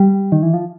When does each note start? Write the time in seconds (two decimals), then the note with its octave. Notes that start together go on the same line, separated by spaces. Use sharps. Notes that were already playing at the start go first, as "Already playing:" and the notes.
Already playing: G3
0.32 D#3
0.43 E3
0.54 F3